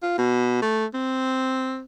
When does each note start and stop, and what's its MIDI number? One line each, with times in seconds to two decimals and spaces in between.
0.03 0.15 65
0.18 0.61 47
0.62 0.86 57
0.94 1.84 60